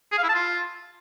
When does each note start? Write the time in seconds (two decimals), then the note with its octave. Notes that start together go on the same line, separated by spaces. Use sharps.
0.12 G#4
0.18 F5
0.23 E4
0.29 A5
0.35 F4